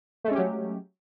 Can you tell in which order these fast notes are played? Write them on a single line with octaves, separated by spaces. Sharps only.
A3 G#3 C#4 G4 F#3